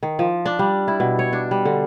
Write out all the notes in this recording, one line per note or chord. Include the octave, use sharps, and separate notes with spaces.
D#3
F3
D4
G3
E4
B2
C#5
D4
G3
D3